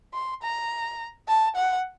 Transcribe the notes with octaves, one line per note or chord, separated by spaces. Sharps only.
C6
A#5
A5
F#5